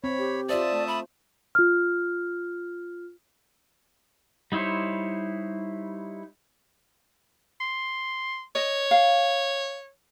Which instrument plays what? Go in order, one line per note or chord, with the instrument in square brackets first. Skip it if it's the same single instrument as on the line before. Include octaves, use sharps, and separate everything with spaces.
[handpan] C4 [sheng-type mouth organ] C#5 B5
[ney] G4
[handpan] F4 C5 [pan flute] D5 [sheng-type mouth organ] E5 A5 D#6
[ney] A3
[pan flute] B5
[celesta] F4 F6
[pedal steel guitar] G3 D#4 E4 C5 C#5
[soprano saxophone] C6
[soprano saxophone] C#5 [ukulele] D#5
[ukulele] F5